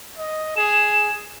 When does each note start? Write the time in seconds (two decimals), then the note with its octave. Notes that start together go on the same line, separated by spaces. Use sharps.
0.18 D#5
0.56 G#4 E7